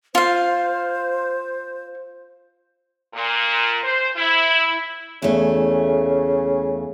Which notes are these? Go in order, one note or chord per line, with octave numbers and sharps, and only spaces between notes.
F4 C5 F5
A#2
C5
E4
E2 C#3 A3